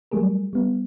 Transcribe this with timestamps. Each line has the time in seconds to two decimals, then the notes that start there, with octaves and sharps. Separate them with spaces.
0.11 F#3 G3 A3 G#4 A#4
0.53 G3 B3